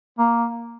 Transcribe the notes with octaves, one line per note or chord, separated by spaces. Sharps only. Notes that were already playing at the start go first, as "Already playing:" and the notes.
A#3